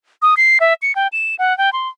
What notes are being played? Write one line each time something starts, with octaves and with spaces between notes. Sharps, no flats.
D#6
C7
E5
C#7
G5
E7
F#5
G5
C6